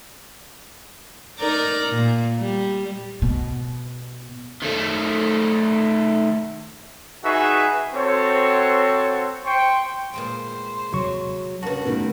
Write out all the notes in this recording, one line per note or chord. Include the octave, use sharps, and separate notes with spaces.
D#4 A#4 D5
A#2
G3
B2
D#3 A3
D#4 F#4 G#4 B4 E5 C#6
C4 F#4 A4 C5 C#5
C5 G5 C#6
A#2 G#3 C5 G5
D#2 C3 F#3 C#6
G2 C#3 F#4 A#4 A5
B2 D#3 A3 C#4